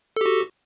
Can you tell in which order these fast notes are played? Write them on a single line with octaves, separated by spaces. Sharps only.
A4 G4 F#4